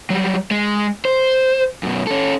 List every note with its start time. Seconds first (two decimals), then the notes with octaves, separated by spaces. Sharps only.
0.10 F#3 G3
0.51 G#3
1.05 C5
1.83 F#2 B2
2.07 C#4 A4